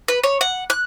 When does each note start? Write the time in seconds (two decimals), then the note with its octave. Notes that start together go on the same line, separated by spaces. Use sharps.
0.08 B4
0.24 C#5
0.41 F#5
0.70 F#6